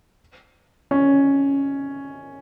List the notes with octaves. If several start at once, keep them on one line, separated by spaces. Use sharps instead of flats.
C#4